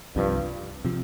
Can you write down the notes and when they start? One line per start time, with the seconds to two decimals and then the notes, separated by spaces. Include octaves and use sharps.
0.16 C2 G2 C3 F3
0.85 C3 F3